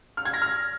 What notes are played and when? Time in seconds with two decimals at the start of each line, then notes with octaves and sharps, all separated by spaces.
0.17 F6
0.25 G#6
0.34 A#6
0.42 F6